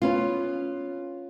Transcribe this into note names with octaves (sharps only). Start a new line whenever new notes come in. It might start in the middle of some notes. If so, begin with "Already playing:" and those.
B3 C#4 F4